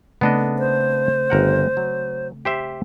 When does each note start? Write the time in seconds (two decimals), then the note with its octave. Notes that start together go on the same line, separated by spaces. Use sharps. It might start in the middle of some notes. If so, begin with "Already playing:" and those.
0.21 C#3 A3 B3 C4 D4 D#5
0.59 C5
1.30 G1 A#4 F#5
1.77 F#3
2.45 G4 C5 E5